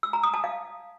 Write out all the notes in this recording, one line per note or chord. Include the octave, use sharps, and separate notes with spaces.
E6
A#5
D#6
A5
F5